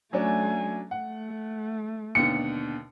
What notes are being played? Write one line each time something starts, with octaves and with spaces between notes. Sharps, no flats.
F#3 A3 C#4 D4 G#5
A3 F#5
D#2 B2 D3 C#7